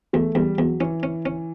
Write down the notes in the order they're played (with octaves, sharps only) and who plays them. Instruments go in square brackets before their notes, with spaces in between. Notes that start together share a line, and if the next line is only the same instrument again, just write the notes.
[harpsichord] E2 [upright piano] A3
[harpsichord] E2 [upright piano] G3
[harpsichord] E2 [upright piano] F#3
[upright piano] E3 [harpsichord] C#4
[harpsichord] C#4
C#4